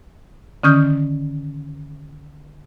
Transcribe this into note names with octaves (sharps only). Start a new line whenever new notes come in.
D3 D#3 C#4 D#6 F6 G6